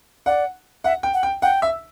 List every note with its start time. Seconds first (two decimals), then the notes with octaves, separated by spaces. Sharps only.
0.26 D5 F#5
0.84 E5 F#5
1.03 G5
1.14 F#5
1.23 G5
1.42 F#5 G5
1.62 E5